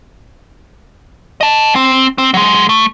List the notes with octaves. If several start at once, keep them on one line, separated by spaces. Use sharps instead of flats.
D#5 A5
C4
C4
F#3 G#3
A3